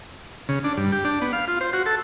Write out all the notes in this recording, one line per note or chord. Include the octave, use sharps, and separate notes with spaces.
C#3
D4
G2
G4
D4
B3
F5
F4
C5
F#4
A4